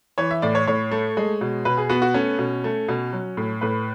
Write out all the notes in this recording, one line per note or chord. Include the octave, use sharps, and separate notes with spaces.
E3 C#5
E5
A2 D5
C#5
A2 C#5
A3
G#3
B2
B2 B4
G#4
B3 F#4
F#4
A3 C#4
B2
A3
B2
F#3
A2
A2 B4